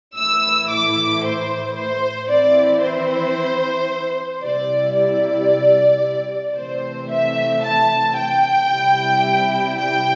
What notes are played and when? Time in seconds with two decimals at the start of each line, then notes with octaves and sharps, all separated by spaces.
0.16 A2 E3 A3 E4 E6
0.71 D6
1.24 C5
1.78 C5
2.30 E3 C4 E4 D5
2.83 C5
4.44 C3 G3 E4 D5
4.97 D5
6.57 C3 E3 A3 C4 C5
7.11 E5
7.64 A5
8.17 G5
8.70 C3 G3 E4
9.77 G5